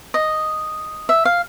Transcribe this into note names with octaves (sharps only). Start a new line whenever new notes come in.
D#5
E5
F5